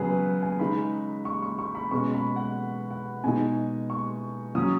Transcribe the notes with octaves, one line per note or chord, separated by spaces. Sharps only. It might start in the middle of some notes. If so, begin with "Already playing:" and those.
Already playing: C#3 F#3 B3 G#4 B4
B4
G#5
C#3 G#3 D#4 B5
C#6
C#6
C#6
B5
B2 G#3 C#4 C#6
B5
F#5
F#5
B2 G#3 D#4 G#5
C#6
F#3 C#4 D#6